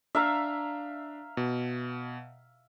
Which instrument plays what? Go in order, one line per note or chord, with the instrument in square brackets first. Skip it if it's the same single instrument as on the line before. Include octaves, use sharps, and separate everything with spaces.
[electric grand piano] D4 [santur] E5 F5 A#5
[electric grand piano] B2